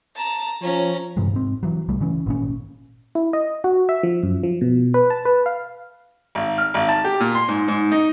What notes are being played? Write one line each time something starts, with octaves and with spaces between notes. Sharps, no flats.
A5 A#5
F3 C#4 A#5
G2 C3 E3 G#3
G#2 C4
E3 F#3
C2 G3 A3
C#3 E3 C#4
G#1 A#2 C#4
E4
D#5
F#4
E5
F3
F#2
F3
B2
B4
A5
B4
F5
G#1
F6
G#1
A5
G4
A#2
C6
G#2
G#2
D#4